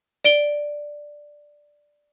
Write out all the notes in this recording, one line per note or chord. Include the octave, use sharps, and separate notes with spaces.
D5 D7 G7